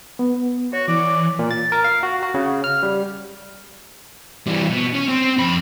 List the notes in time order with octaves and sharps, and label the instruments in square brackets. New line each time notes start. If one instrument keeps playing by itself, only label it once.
[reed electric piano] B3
[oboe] F#4 [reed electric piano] C#5
[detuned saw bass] E3 [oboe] D5
[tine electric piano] A#2
A6
A#4
F5
F#4
F#4
C#3
F6
G3
[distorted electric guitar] E3 G3
B2
C#4
C4
F2 B5